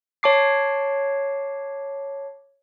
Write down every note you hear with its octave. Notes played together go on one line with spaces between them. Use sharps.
C#5 A5 D6 C7